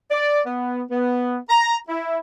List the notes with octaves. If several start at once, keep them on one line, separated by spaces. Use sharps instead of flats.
D5
B3
B3
A#5
E4